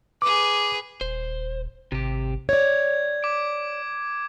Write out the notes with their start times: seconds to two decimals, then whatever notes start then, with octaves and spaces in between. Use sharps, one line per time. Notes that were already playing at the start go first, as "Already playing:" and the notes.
0.22 G#4 B4 D6
1.01 D#1 C5
1.92 G#1 C3 G4
2.49 C#5 D5 G#6
3.23 D6 D7